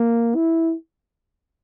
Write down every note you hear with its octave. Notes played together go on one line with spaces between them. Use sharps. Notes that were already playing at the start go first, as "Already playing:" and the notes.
Already playing: A#3
E4